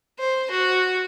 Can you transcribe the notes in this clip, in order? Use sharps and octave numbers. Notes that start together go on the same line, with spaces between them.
C5
F#4